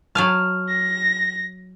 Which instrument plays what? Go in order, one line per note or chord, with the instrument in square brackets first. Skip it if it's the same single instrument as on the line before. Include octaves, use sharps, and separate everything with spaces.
[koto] F#3 G#5 A5 [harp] F6
[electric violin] A#6